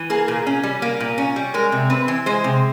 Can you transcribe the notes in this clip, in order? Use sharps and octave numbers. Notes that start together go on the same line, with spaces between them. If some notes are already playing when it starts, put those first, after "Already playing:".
Already playing: E3
A#3 G#4
A#2
C#4
G3
A#3
A#2
C#4
G3
G#3 A#4
C3
C4 B4
E3
G#3 C5
C3